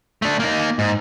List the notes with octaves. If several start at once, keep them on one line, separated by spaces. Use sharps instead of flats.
A3 D4
A#3 D#4
G#2